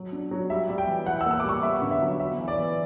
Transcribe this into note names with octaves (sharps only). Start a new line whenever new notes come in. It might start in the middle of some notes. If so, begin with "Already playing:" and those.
Already playing: F#3
D4
F#3
G3 E5
G3
G5
E3
E4 F#5
E6
A#3
E6
D6
G3 C#6
B3 E5
D3
E5
F#3
B3 E5
E3
D5
E3